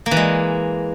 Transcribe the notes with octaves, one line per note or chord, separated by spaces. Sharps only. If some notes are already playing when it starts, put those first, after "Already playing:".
A#3
E3
G#3